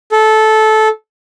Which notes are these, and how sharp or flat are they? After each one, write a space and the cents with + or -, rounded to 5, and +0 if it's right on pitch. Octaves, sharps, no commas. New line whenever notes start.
A4 -15